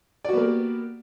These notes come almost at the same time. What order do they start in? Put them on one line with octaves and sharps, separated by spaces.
D5 F#4 B3 A#3 G4